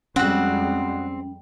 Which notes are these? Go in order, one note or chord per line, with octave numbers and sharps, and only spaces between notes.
F2 G3 G#3 C4 C#4 F#4 F#5